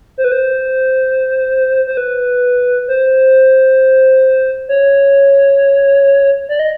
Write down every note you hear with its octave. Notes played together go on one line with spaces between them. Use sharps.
C5
B4
C5
C5
B4
C5
C#5
D5
D#5